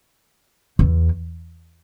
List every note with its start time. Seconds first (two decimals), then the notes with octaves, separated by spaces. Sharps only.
0.79 E2